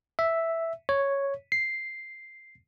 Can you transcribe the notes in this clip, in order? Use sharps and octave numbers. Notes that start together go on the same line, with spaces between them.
E5
C#5
C7